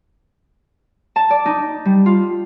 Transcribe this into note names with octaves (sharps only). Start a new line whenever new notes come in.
A5
D5
D#4
G3
F4